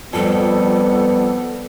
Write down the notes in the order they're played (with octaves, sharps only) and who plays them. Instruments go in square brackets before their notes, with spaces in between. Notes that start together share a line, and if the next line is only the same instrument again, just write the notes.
[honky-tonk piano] F2 [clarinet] G3 [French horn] B3 [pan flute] A4